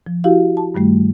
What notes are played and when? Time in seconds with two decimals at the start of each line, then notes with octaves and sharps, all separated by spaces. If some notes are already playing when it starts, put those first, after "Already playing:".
0.07 F3
0.24 E4 F#4 G4 F5
0.57 A5
0.75 G2 D#3 G3 A3